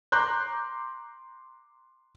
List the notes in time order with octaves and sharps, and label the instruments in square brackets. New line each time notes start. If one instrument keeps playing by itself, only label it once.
[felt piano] A#5 C6 D6 F#6 G6